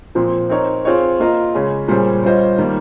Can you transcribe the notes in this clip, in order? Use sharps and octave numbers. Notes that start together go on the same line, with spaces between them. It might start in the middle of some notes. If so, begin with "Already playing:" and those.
A#2 F3 C4
C4 D#4 A#4 C#5
C4 F4 G#4 C#5
A#3 F4 A#4 D#5
C#3 G#3 C#4
A#2 G3 C#4 G#4 C5
G3 C#4 F4 C5 D#5
D#3 G3 A#3